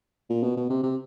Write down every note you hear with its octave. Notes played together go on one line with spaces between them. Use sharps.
A#2
B2
B2
C3
C3